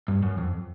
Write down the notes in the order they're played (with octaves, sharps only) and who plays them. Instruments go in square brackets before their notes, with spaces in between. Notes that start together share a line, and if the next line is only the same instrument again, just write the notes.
[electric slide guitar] G2
F#2
F2